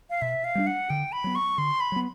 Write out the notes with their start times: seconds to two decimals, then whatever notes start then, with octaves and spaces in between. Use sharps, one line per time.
0.10 F5
0.22 B2 E5
0.44 F5
0.55 G3 B3 D4
0.67 F#5
0.90 D3 G5
1.12 B5
1.24 F#3 B3
1.35 C#6
1.58 D3 C6
1.80 B5
1.92 F#3 B3